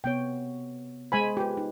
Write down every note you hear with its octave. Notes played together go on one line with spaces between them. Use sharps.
C3 B3 C#5 G5
G#3 C5 G#5 B5
F4 G4 B4
D#4